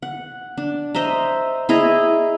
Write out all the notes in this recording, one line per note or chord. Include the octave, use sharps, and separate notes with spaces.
F#5
D4
C5 D#5 E5 A#5
E4 G#4 D#5 A#5